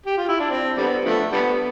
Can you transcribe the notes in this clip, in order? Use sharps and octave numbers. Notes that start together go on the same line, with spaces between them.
G4
F4
E4
D4
C4
D3 G3 B3
D3 F3 A3
D3 G3 B3